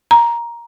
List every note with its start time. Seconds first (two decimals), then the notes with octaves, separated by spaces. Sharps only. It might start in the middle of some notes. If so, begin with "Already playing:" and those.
0.11 A#5